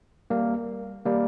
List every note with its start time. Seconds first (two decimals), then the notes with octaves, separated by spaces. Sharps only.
0.30 G3 A#3
1.06 G3 A#3